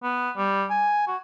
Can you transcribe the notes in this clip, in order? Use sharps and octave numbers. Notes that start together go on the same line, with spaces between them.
B3
G3
G#5
F#4